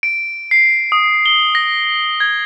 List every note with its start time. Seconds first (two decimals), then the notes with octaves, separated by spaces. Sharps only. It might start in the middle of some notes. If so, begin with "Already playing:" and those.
0.03 D7
0.51 C7
0.92 D#6
1.26 G7
1.55 A#6
2.20 G#6